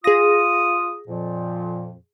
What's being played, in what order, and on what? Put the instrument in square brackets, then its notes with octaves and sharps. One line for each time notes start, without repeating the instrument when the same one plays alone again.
[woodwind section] F4 D#6 [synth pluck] G#4 A#6
[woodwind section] F2 A#2 F3